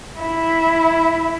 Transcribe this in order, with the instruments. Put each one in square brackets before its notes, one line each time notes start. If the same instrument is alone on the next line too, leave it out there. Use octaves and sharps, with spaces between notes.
[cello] E4